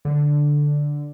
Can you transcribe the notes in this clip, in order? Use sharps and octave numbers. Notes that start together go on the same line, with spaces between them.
D3